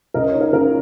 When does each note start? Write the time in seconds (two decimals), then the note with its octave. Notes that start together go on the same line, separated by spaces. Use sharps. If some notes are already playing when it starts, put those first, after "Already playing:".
0.14 C#2 A#4 D#5
0.28 C#5
0.34 D#4
0.41 A#4
0.53 C#3 A#4